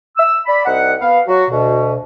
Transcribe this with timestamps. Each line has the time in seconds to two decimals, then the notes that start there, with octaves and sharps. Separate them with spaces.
0.17 E6
0.46 D5 B5
0.66 C2 D#4 F#5
1.01 B3 F5
1.27 F#3 F#4
1.51 D2 B2